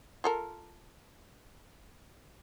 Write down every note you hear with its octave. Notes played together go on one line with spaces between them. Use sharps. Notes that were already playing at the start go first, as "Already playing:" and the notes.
F4 A4 A#4